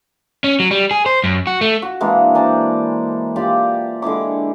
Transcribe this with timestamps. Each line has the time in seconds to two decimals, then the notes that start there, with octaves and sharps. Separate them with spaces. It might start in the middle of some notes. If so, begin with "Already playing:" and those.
0.44 C#4
0.60 F#3
0.71 G3
0.91 G#4
1.06 C5
1.24 F#2
1.47 F#4
1.61 A3
1.82 F#4
2.00 E3 G#3 A#3 D4
2.34 C5 D5 G#5 A#5
3.36 F4 G4 D5 G5
4.02 D3 G#3 E4 D6